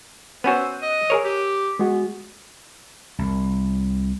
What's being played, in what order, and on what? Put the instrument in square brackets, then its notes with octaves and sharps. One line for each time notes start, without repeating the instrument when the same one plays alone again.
[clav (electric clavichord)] B3 C#4 F#4 [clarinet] C5 [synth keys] E6 F#6 D#7
[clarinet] D#5
[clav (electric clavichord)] G#4 A#4 C#5
[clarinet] G4
[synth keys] G#3 F#4 [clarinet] B3
[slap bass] C2